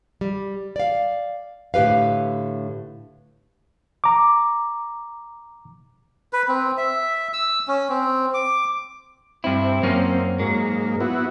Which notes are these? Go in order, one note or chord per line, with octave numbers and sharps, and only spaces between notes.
G3
D5 F5
A2 D3 G4 B4 F5
A#5 D6
B4
C4
E5
E6
C#4
C4
D6
G2 C4 E4
F#2 A#3 C#4
G#2 F#3 A#3
B3 E4 F#4